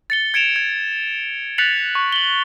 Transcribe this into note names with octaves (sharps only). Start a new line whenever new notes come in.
A6 C#7 G7
G#6 C#7 D7 E7 F7
G#6
F#6 A6 B6 C#7 F7 F#7
C#6
F#7 G7